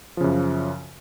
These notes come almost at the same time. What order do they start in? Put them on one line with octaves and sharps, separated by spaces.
F3 C#3 F#2